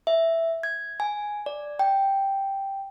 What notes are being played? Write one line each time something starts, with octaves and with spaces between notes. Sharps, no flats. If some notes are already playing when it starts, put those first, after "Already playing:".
E5
G#6
G#5
D5
G5